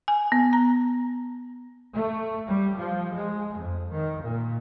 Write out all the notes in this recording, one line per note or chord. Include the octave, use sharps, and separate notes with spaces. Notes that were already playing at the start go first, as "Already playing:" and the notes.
G#5
B3
A#5
A3
G3
F3
G#3
F2
D#3
A#2